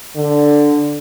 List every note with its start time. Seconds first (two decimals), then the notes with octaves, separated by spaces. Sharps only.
0.16 D3